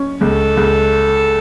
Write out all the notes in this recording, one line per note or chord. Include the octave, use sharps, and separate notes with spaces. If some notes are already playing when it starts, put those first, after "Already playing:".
Already playing: C#4
C#2 A4
C#2